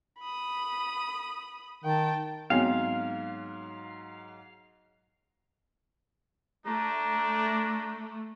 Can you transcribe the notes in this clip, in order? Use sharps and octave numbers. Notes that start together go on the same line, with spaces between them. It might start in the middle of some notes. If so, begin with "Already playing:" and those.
B5 D#6
D#3 G5 A5
G#2 F#3 B3 C4 F5 C7
A3 D4 A#5